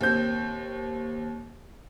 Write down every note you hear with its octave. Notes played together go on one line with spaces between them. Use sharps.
D#2 C4 G6